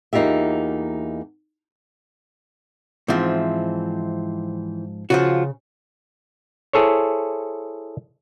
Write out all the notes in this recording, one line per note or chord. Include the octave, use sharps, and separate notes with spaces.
E2 A#3 D#4 F4 G4 E5
G#2 E3 F3 C4 E5
C#3 F3 F4 F#4
E4 G#4 A4 C5 C#5